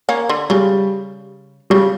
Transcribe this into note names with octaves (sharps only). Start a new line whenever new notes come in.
A#3 C#4
D3
C#3 G3
C#3 G3